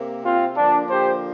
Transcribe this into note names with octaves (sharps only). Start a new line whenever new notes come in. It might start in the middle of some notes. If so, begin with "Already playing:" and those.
Already playing: C3 A#3
C4 F4
D3 F3 A#3 D4
G4 C5